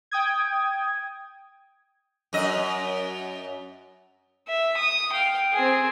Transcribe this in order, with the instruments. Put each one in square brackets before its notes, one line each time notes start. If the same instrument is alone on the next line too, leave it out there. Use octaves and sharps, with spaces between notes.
[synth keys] G5 D#6 G#6
[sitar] F#2 D#5
[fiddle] E5
D#6
F5 G5
C4 G#4